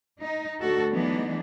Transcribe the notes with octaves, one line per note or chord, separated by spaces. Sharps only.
D#4
D2 F#4 A4
E3 F#3 G#3 B3 D4 D#4